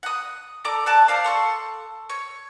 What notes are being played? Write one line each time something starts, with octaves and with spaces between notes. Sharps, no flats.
F#5 D#6
A4 D5 A#5 D6
F#4 D5 A5
C5 D5 F5
A4 C6 C#6
C#5